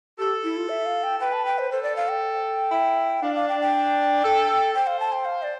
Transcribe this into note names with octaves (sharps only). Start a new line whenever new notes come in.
G4 A4
E4
F4
E5
F5
G5
B4 G5
A5
G5
C5
A4 C5
D5
F5
G5
E4
D4 F5
F5
G5
G5
A4
C5 G5
F5
A5
G5
F5
D5